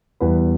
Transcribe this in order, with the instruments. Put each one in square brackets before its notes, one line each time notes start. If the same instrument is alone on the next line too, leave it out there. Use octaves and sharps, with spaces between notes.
[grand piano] E2 E3 G3 B3 B4